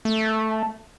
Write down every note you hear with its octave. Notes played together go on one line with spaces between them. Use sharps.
A3